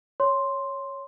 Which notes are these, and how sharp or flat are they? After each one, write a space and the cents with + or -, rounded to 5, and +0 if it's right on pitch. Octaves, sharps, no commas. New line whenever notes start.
C#5 +0 C6 +0